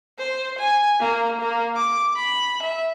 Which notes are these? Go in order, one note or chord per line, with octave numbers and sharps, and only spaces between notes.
C5
G#5
A#3
A#3
D6
B5
E5